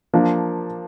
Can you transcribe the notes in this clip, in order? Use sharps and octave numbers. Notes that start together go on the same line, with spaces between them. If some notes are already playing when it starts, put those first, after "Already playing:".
F3 A#3 D4